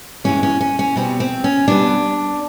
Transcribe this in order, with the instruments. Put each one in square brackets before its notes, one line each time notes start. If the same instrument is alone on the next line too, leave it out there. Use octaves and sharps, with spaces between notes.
[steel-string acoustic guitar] G2 E3 G#3 C#4
C#4
C#4
C#4
B2 G3 B3 C4
C4
C#4
B2 G3 B3 D4